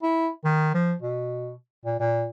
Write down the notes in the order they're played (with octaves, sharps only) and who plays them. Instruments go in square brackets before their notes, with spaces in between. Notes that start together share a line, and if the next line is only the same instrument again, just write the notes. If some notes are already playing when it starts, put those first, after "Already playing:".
[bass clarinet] E4
D#3
F3
B2
A#2
A#2